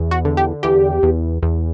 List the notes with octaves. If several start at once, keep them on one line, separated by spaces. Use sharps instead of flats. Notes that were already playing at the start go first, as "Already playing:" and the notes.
Already playing: E2
F#4
D3
G4
E2 G4
E2
E2